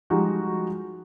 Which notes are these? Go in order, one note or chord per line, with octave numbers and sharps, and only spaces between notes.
F3 G3 G#3 D#4 F#4